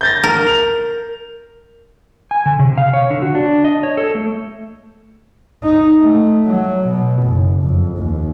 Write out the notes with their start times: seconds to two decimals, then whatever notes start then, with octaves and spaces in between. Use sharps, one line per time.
0.01 G6 A6 A#6
0.23 A#4
0.47 F7
2.31 G#5
2.46 D3
2.59 C3
2.78 F5
2.93 C#5
3.10 D3
3.22 F#4
3.35 D4
3.64 D#5
3.83 C#5
3.97 A4
4.15 A3
5.63 D#4
6.00 A3
6.47 F#3
6.88 B2
7.24 F#1
7.63 F2
7.99 D#2